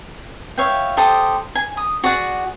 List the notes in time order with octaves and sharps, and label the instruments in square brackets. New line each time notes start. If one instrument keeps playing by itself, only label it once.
[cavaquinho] C#5 E5 F5 G5
G4 A4 C5 D#6
G#5
D#6
F#4 G#4 D5 F#5